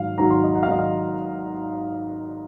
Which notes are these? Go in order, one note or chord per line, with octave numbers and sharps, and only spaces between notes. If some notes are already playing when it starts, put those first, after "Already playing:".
Already playing: G#1 G#2 F#3 F5
G#1 G#2 F#3 A#5
C6
D#5
F#5
F5
G#1 G#2 F#3 D#5
F5